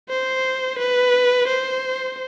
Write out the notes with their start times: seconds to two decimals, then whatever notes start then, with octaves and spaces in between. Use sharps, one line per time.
0.10 C5
0.79 B4
1.48 C5